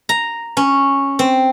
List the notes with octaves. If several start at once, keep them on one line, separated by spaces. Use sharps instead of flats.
A#5
C#4
C4